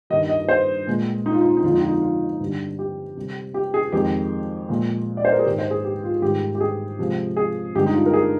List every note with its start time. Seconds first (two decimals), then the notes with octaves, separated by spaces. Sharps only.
0.10 G2 D#3 G3 D#5
0.29 D#5
0.49 C5
0.87 A#2 G#3
1.26 D#4
1.33 F4
1.41 D#4
1.49 F4
1.57 D#4
1.63 F2 D3 F3 G#3 F4
1.72 D#4
1.80 F4
1.88 D#4
2.02 F4
2.40 G2 D3 G3
2.79 G4
3.16 C3 G3
3.54 G4
3.74 G#4
3.92 F2 D#3 G#3 G4
4.69 A#2 F3 G#3
5.17 D5
5.25 C5
5.32 A#4
5.39 G#4
5.46 G#2 D#3 G#3 G4
5.59 C5
5.71 G#4
5.85 G4
6.04 F4
6.22 G#2 D#3 G3 G4
6.55 G4
6.60 G#4
6.99 C3 F3 G#3
7.36 G#4
7.75 G2 D3 G#3 G4
7.86 D#4
7.94 F4
8.06 A#4
8.13 G#4